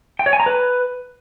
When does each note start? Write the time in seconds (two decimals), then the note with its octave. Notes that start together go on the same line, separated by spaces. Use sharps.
0.19 G5
0.26 C#5
0.33 G#5
0.40 A#5
0.46 B4